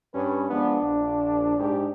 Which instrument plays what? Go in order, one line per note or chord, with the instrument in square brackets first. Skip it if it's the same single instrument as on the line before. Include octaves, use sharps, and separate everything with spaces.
[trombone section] G2 G3 C#4 [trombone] B4
[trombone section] F3 G#3 B3 [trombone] D4
[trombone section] A#1
G#2 G4